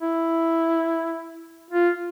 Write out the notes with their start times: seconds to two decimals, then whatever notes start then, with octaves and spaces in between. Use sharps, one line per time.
0.02 E4
1.71 F4